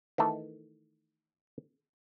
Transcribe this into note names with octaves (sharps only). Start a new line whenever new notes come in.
D#3 E3 A3 A4